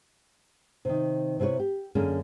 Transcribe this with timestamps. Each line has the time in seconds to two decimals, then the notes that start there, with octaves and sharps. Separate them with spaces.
0.85 C3 D#3
1.40 C3 E4 G#4 B4 C#5
1.59 G4
1.95 F#2 D3 A#3 C#4 G#4